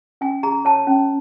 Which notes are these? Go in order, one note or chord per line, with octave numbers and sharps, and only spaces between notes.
C#4 G#5
G#4 A#5
C#5 A5
C#4